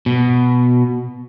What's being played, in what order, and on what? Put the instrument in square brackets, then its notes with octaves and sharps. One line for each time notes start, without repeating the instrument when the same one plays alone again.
[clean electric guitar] B2